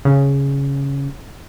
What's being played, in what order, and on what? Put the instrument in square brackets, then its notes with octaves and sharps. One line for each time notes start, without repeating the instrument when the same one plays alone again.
[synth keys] C#3